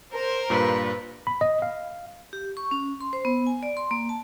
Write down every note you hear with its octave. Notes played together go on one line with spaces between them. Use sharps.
A#4 C5
G2 A#2 B4
B5
D#5
F5
G4
C#6
C#4
C6
C5
B3
G#5
D5
C6
A#3
A5